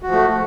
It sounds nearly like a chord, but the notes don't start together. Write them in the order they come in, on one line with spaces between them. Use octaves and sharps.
F#4 F3 A3